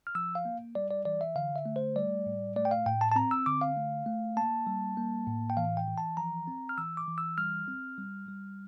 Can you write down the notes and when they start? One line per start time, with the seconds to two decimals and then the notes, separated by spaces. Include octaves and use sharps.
0.07 F6
0.15 F3 E6
0.35 F5
0.45 A#3
0.75 G3 D5
0.91 D5
1.05 E3 D5
1.21 E5
1.36 D3 F5
1.56 E5
1.66 A3
1.76 C5
1.96 G3 D5
2.26 A2
2.56 A3 D5
2.65 G5
2.71 F5
2.86 A2 G5
3.01 A5
3.11 A5
3.16 C4 A#5
3.31 E6
3.46 D3 D6
3.61 F5
3.77 A3
4.06 A3
4.37 A#3 A5
4.67 G3
4.97 A#3
5.27 A2
5.50 G5
5.57 E3 F5
5.77 G5
5.87 E3
5.98 A5
6.17 F3 A#5
6.47 C4
6.69 F6
6.78 E3 E6
6.97 D6
7.08 E3
7.18 E6
7.38 G3 F6
7.68 C4
7.98 G3
8.28 G3